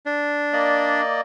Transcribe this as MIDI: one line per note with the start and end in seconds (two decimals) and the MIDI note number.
0.06 1.01 62
0.53 1.21 58
0.53 1.21 74
0.53 1.21 75